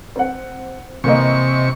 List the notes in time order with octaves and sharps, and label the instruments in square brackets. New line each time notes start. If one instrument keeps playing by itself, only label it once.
[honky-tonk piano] C4 F#5
[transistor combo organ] C3 C#6 [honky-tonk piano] E3 A#3 D#5